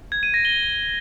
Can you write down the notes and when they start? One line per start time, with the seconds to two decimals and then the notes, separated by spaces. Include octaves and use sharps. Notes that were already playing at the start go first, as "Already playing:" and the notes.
0.12 G#6
0.23 D#7
0.34 A#6
0.45 G7